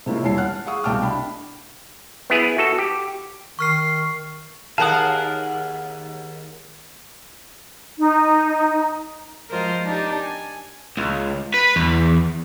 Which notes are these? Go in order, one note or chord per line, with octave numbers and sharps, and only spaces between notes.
C3 G#3 A#3 C#4 E4 F4
E1 G3 E4 C#5 A5 C7
F#5 F6 F#6
G#4 F5 F#5 C#6 D#6
C2 B2 G5 A5 D6 F6
D4 G5 B5
B3 E4 G#4 B4
F#4 A4
G4
D#3 C#6 F6 C7
D#2 G#4 A#4 F5 F#5 A5 D#6
D#4
F3 G#3 F4 A#4 C5 D#5
D4 D#4 G4
G#5
C#2
B4
E2